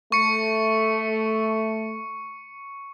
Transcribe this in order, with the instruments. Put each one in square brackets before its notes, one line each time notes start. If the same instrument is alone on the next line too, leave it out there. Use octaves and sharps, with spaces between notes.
[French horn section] A3 [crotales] C#6 C#7